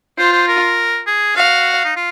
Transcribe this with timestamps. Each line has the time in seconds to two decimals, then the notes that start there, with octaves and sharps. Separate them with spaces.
0.18 F4 C5
0.33 C5
0.48 A#4
1.06 G#4
1.36 F#4 F5
1.85 D#4
1.96 F4